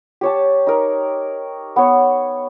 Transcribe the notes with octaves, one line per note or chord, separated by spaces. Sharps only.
G4 C#5 A5
D#4 A#4
B3 C#5